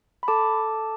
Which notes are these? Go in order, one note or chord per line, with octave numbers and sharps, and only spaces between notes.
B5
A4 A5 D6